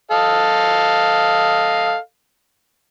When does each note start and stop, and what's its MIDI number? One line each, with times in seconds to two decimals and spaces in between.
0.11 1.97 69
0.11 1.97 75
0.11 1.97 77